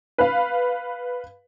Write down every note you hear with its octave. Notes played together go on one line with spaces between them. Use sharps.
B4 F5